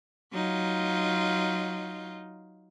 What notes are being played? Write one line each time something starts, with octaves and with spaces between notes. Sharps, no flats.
F#3 D#4 F4